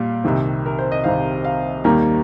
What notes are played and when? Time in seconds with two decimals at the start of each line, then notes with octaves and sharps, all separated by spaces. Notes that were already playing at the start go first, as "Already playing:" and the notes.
Already playing: A#2 G3 F5
0.24 C2 C3 D#3 C4
0.66 A#4
0.79 C5
0.92 D#5
1.04 C2 C3 D#3 C4 F5
1.45 F5
1.84 D#2 D#3 G3 A#3 D#4 A#5